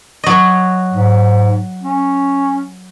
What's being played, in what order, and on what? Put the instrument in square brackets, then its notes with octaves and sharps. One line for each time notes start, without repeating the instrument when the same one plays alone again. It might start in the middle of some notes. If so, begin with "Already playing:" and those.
[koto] F#3 D#5
[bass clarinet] G#2
C#4